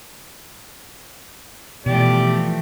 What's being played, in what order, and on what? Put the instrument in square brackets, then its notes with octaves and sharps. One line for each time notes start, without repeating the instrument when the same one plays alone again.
[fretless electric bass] B2 [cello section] E3 F3 A3 [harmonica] G4 D5